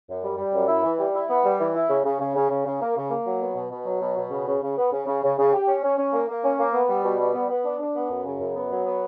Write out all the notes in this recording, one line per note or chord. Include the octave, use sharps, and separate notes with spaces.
F#2
G3
G3
F#2
E4
E3
G3
E4
B3
G3
E3
E4
C#3
C#3
C#3
C#3
C#3
C#3
A#3
C#3
A#3
F#3
B2
B2
B2
F#3
B2
B2
C#3
C#3
C#3
B3
C#3
C#3
C#3
C#3
G4
C#4
C#4
C#4
A#3
A#3
C#4
A#3
B3
G3
B2
G3
B3
B3
D4
D4
B3
F#2
C#3
F#2
B3
F#3
B3